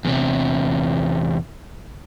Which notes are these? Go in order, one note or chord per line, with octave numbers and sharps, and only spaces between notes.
E2 C3